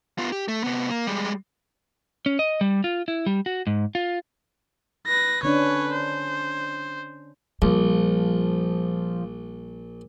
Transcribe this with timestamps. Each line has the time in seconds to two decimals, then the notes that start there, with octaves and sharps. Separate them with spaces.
0.18 B3 F4
0.32 G4
0.48 A3
0.64 C3 B3
0.90 A#3
1.07 G3 G#3
2.26 C#4
2.39 D#5
2.61 G3
2.84 F4
3.08 E4
3.26 G3
3.46 F#4
3.67 G#2
3.95 F4
5.07 B4 A#6
5.43 D3 C#4 D4 B4 C#5
5.93 C5
7.62 A#1 F3 G3